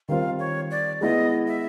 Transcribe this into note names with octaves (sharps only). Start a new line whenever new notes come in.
D#3 G3 C4 F4 A#4 F5
C#5
D5
G#3 B3 E4 D#5
E5